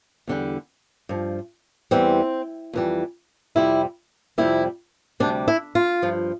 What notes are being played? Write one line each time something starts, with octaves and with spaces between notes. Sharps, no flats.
E2 D3 G3
G2 F3
E2 E3 G3 C4
F2 E3 G3
F2 C3 G3 E4
F2 C3 G3 E4
D2 C3 G3 D4
E4
F4
G2 F3